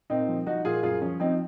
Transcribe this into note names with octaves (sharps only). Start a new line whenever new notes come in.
A#2 C4 D#4
F3
F3 D#4 F#4
A#2 F4 G#4
F#2 F4 G#4
F3 C#4
F3 C4 D#4